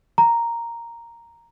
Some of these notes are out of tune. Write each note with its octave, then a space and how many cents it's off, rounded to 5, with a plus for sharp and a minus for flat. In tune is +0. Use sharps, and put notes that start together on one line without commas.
A#5 -5